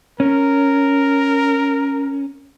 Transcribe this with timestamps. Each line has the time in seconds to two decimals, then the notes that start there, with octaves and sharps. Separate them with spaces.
0.20 C#4 A#4